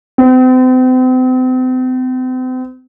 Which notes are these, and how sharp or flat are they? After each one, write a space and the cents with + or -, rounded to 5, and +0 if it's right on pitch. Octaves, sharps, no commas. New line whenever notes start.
C4 -40